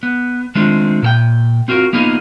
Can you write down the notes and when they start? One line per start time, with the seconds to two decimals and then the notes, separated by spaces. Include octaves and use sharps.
0.03 B3
0.55 D#3 G#3 A3 C4 D4 F4
1.03 A#2 A4 G5
1.68 C4 F4 F#4 A4 A#4
1.93 A#3 B3 D#4 F4 G#4